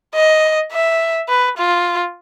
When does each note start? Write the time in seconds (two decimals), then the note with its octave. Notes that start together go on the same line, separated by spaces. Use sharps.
0.15 D#5
0.72 E5
1.28 B4
1.58 F4